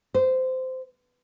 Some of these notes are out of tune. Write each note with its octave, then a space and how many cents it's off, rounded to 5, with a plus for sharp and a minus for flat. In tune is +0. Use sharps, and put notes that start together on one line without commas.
C5 -15